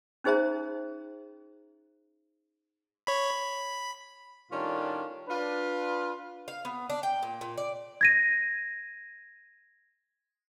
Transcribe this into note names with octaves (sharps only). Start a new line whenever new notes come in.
C#4 D#4 G#4 C5 E5 A#5
C#5 B5
B5
A2 D#3 G3 C#4 D4 F4
D4 F4 B4
F5
B3
D4
G5
A#2
A#2
D5
G#6 A#6 D#7